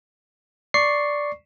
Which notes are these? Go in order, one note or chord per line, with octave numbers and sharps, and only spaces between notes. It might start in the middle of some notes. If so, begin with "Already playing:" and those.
D5 C#6 C7